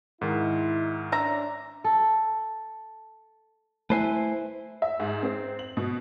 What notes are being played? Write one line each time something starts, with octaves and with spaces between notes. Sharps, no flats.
G#2 D#3 E4
C#4 D4 E5 A#5
A4
A3 E4 B4 C5 G#5
E5
G#2
C4
F#7
B2